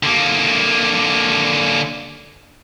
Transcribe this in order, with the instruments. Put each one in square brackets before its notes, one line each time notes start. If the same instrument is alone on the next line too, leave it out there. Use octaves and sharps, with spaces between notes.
[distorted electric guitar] D3 A#3